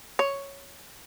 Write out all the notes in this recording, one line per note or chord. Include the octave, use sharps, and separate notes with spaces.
C#5